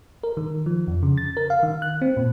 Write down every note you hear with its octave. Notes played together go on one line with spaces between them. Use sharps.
A#4
D#3
F3
F2
C#3
A6
A#4
F5
D#3
F#6
C4
A#2